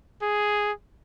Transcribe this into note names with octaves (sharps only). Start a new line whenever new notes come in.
G#4